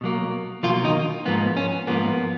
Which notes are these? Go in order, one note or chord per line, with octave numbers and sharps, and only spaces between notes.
B2 F#3 A#3
B2 F3 F#3 A#3 F4
D#3 D#4
G#2 F3 A#3 B3
C#4
G#2 F3 A#3 B3